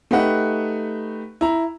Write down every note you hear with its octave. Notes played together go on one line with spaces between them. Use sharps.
A3 D#4 G4 B4 F#5
E4 A#5